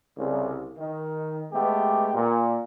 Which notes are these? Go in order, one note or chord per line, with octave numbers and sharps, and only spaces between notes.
C2 C#3
D#3
G#3 A3 B3 G4
A#2